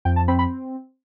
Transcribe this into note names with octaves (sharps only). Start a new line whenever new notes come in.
F2 G5
A5
C4 B5
B5